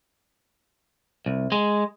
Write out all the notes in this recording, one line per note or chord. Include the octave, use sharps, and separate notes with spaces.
C2
G#3